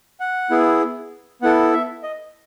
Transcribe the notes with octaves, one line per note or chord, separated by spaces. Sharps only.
F#5
B3 E4 G#4
B3 E4 A4 F#5
E5
D#5